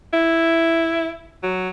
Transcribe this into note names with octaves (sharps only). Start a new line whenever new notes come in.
E4
F#3